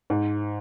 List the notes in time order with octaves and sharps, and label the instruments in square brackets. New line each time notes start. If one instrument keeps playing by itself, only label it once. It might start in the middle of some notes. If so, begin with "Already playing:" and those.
[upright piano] G#2